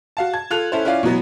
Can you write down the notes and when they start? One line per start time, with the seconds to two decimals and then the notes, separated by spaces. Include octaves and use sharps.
0.17 F#4 F5 A5
0.33 A5 G#6
0.50 F4 A4 F#6 F7
0.72 C#4 E4 A4 C5
0.85 C#4 E4 F4 D5 F5
1.03 B2 E3 F#3 B3